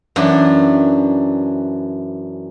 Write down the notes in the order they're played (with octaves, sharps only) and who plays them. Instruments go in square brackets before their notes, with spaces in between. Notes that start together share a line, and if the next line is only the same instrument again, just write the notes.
[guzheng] F#2 E3 D4